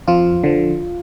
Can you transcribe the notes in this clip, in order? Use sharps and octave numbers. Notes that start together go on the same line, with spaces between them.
F2 F3 F4
D3 F3